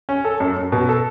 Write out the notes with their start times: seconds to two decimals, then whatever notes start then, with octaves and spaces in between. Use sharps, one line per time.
0.09 C#4
0.25 A4
0.40 F#2
0.57 F#2
0.72 B2
0.89 A4